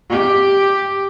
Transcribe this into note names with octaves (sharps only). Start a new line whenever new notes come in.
G4